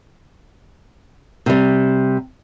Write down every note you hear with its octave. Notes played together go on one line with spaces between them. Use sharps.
C3 G3